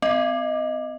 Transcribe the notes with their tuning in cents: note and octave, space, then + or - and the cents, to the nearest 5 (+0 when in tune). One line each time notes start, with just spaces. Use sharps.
C4 -45 D#5 +0